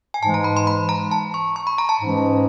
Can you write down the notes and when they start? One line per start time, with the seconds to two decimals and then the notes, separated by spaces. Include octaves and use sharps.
0.14 G#5
0.22 G#2 E3 G#3 A5
0.34 A#5
0.44 B5
0.57 C6
0.67 B5
0.89 A#5
1.11 A5
1.34 C#6
1.56 C#6
1.67 B5
1.78 A#5
1.89 A5
2.01 G#2 E3 G#3 C#4